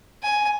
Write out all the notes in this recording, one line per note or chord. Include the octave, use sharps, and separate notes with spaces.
G#5